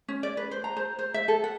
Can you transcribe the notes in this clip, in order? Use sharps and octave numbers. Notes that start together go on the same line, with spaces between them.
C#4
D5
B4
C5
A#5
C5
C5
E5
A4
F#5